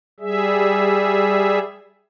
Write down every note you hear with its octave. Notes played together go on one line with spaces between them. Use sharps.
G3 G#4 E5